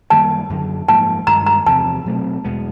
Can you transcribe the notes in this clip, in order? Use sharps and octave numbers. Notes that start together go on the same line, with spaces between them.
F#2 D#3 G3 A#3 A5
F#2 D3 F#3
G#2 F3 A#3 A5
G2 D#3 G#3 A#5
A#5
E2 C3 F3 A5
B2 F#3 A3 C4
E2 B2 G#3 B3